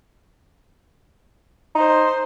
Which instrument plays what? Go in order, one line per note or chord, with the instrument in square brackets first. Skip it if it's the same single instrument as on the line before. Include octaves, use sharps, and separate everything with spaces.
[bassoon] D#4 [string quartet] C5